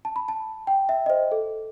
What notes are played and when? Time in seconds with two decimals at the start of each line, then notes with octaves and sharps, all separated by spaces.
0.05 A5
0.16 B5
0.28 A5
0.67 G5
0.89 E5
1.06 D#5
1.10 C5
1.32 A4